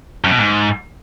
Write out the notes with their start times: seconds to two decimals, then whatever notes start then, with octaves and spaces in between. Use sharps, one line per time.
0.24 F#2
0.31 B2
0.39 G#2